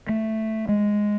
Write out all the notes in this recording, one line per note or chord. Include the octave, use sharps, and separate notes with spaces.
A3
G#3